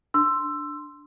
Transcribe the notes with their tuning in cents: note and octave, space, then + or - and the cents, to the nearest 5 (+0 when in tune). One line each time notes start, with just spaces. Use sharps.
D4 +0 C6 +0 E6 +15